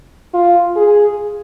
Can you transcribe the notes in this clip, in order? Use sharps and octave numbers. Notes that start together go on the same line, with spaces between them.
F4
G#4